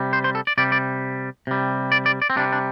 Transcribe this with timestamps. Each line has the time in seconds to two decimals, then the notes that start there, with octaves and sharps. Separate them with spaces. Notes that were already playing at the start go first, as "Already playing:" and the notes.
Already playing: C3 G3
0.13 C5
0.24 C5
0.35 A4
0.47 D5
0.58 C3 G3 D5
0.72 D5
1.47 C3 G3
1.92 D5
2.06 D5
2.22 D5
2.30 C4
2.36 C3 G3 D4
2.52 D4